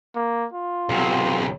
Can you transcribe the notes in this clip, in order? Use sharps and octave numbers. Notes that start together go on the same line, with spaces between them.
A#3
F4
B1 C3